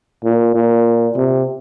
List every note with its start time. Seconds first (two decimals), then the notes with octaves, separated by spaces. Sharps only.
0.24 A#2
0.55 A#2
1.16 C3